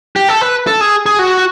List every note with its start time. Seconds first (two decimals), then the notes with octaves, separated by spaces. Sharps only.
0.16 G4
0.29 A4
0.41 B4
0.67 A4
0.81 G#4
1.06 G#4
1.19 F#4